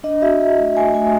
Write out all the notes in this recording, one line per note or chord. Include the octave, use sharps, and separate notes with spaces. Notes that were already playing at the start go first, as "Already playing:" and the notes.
D4 D#5
F#4 E5
D4
A3
A3 G#5
A3 G#5